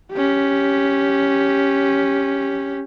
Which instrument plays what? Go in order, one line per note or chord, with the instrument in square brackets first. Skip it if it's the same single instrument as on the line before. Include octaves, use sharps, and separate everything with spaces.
[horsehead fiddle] C#4 G4